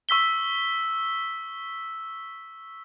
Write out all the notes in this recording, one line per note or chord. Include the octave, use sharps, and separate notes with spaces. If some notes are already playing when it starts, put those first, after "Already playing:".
C#6 E6 B6 G7